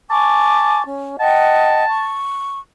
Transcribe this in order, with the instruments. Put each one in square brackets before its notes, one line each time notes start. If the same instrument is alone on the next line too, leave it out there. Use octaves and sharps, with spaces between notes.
[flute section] G#5 C#6 D6 [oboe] A5
[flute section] C#4
[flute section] D#5 F#5 G5 [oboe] A5
[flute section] C#6